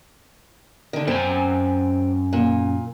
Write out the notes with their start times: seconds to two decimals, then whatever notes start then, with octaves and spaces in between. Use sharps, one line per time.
0.93 D3 D#3
1.07 F#2 C4 G#5
2.33 A#2